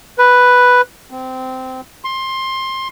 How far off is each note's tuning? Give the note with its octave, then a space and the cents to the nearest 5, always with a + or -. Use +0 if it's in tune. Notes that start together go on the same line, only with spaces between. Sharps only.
B4 +0
C4 -15
C6 +20